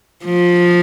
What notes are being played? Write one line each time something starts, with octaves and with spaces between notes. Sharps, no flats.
F3